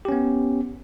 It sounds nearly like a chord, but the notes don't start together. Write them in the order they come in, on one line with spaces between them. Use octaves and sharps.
G4 C#4 B3